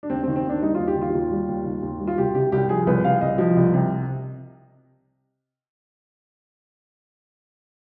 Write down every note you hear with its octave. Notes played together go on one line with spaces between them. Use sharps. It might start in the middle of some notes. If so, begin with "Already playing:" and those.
D4
D#2 C4
C4
D#3
C4
D#2 D4
G3 D#4
F4
D#2
G4
D#3
F4
D#2
G3
D#2
D#3
D#2
G3
F4
C2 G4
C3 G4
C2 G4
F3 G#4
C2 B4
C3 F5
C2 D#5
F3
C2
C3